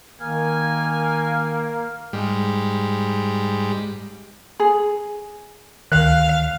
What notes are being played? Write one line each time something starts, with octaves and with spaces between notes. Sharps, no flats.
D#3 A#3 G#5 F6
G#2 G3
G#4
D2 D#3 F5 F#6